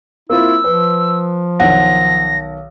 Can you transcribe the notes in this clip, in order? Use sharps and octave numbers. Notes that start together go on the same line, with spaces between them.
A#3 C4 E4 F4 E6
F3 B4
B1 D#3 F#5 A#6